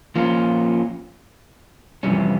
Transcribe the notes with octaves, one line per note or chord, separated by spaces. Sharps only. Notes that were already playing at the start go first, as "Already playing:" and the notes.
F3 A#3 C#4 F4
F2 C3 E3 G3 C#4